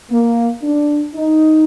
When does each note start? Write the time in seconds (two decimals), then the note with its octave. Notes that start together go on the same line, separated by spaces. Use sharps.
0.10 A#3
0.62 D4
1.15 D#4